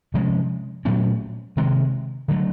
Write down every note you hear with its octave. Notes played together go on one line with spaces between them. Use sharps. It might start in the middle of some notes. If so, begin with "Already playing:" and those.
C3 F3 G#3 C#4
A#2 F#3 A3 C#4
C3 D#3 G#3
D3 F#3 A3